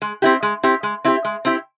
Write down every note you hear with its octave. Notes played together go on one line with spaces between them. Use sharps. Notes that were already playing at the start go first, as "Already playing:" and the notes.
G#3
C4 E4 G4
G#3
C4 E4 G4
G#3
C4 E4 G4
G#3
C4 E4 G4